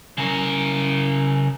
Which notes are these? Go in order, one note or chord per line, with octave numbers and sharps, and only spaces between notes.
C#3 A#4